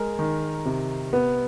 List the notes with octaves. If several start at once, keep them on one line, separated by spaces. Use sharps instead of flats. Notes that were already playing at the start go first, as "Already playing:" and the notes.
Already playing: G#3 A#4
D#3
C3
B3